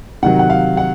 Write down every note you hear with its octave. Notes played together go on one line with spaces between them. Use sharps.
C3 D#3 F#3 F#5
F#5
F5
F#5